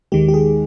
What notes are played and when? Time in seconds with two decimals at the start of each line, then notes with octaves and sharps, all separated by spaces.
0.12 D#2 D#3 G#3 G4
0.28 G4
0.34 G#4